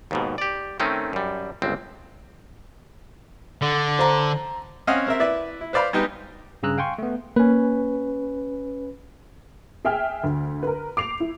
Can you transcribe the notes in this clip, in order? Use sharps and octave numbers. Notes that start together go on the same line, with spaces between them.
D#2 G#2 B2
G4 D5
D#3 A3 C4 C#4 D#4
F#2 G3
G1 C#2 C4
D3
C5 A#5
C4 C#4 D#5 F5 F#5
C4 A#4 E5
E4 B4 D5 E5
E4
B4 C5 D5 F5 B5
G3 G#3 B3 D#4 G4
G2 C#3 G#4 A#5 E6 F#6
F5 G5 G#5 C6 C#6
A3 B3
A#3 C#4 B4
G#4 E5 G5 G#5 F6
D2
A#4 B4
D6 C7 F7
E4